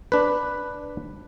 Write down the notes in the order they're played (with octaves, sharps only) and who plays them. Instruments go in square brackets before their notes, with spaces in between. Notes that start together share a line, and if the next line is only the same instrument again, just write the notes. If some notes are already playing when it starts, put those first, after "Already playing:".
[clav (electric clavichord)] D4 B4